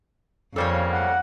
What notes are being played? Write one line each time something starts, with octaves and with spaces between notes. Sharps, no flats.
F2 C#3 G3 A#3 A4 C5 C#5
F#5